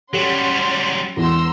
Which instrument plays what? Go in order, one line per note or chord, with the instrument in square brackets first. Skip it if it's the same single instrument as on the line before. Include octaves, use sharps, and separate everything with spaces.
[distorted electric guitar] F#3 G3 [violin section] C#4 F#5 C6 [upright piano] G4
[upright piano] E1 E2 [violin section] A#5 C6 E6